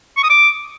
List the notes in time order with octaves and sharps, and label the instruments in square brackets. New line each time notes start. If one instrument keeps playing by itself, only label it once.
[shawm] C#6
D#6
D6